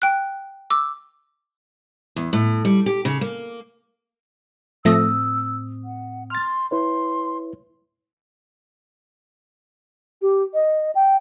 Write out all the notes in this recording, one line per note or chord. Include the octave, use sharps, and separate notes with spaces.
G5 F#6
D6 E6
E2
A2
G3
G4
C#3
A#3
A2 F3 A3 C4 D#6 E6 A#6
F#5
C6 F6 A6
E4 B4 C#5 C6
G4
D#5
G5